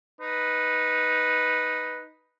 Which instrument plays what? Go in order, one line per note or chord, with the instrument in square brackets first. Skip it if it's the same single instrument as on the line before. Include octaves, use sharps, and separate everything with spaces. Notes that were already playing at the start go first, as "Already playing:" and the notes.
[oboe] D#4 [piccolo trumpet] B4